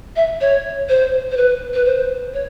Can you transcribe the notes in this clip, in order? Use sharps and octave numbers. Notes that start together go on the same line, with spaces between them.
E5
C#5
C5
C5
B4
B4
C5
C#5